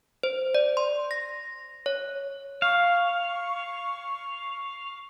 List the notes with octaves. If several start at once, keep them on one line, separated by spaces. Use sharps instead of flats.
C5
D5
C6
A#6
C#5
F5 C#6